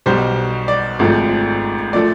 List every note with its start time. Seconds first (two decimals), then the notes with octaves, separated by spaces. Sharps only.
0.06 B1 B2 G3 C5
0.68 D5
0.99 G#1 G#2 F3 A3
1.93 A#2 F3 A3 D5